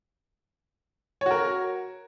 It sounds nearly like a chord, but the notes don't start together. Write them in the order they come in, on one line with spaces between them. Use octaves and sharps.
C#5 F#4 A#4